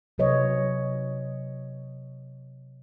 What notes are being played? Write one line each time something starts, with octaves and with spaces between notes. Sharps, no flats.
C3 F#3 B4 C#5 D#5